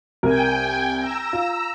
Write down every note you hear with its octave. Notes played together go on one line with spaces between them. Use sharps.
C2 A#4 G5 G#5
A#5 E6
F4